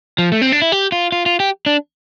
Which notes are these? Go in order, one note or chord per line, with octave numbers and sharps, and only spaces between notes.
F3
A3
C4
D4
E4
G4
F4
F4
F4
G4
D4